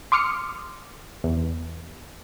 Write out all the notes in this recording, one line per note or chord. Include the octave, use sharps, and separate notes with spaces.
C6 D6 D#6 F6 C#7
E2